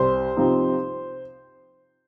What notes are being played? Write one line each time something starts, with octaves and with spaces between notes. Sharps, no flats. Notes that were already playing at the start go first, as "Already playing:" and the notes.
Already playing: C2 C5
C3 F3 C4 D#4